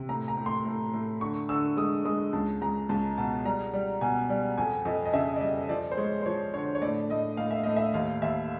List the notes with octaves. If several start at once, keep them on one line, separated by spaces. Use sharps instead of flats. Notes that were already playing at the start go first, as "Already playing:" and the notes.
Already playing: C3
A2 A#5
A#5
A2
C6
A2
A2
D3 C#6
D3 E6
G#3 D#6
G#3 D#6
C#2 A5
C#2 A#5
C#2 A5
B2 A5
G3 A#5
G3
B2 G#5
G3
F2 G#5
F2 D#5
D#5
C#3 E5
D5
G3 D#5
F3 D5
C5
G#3 C#5
C5
F3 C#5
D3 C#5
C#5
A2 D5
A2 D#5
A2 F5
E5
A2 D#5
E5
D#2 F5
D#2 E5